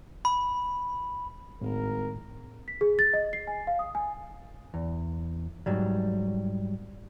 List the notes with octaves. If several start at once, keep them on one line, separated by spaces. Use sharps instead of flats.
B5
G#1 A2 A#4
B6
G#4
A6
D#5
C7
G#5
F5
D#6
G#5
E2
G#2 F#3 G3